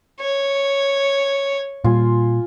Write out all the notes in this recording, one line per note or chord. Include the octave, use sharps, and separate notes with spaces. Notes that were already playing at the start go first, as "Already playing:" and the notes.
C#5
A#2 G3 F4 G#5